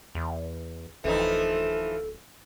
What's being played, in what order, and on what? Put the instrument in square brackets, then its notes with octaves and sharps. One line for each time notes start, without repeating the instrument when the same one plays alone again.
[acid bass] E2
[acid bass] D1 [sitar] E3 F3 D#4 [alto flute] A4